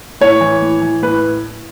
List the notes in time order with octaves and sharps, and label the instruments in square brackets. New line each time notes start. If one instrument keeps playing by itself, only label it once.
[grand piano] A2 C#5
E3
A2
E3
A2 B4